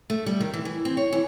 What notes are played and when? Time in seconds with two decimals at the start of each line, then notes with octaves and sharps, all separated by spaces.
0.10 A3
0.26 G3
0.40 D#3
0.53 E3
0.65 E3
0.85 C4
0.97 C#5
1.13 E3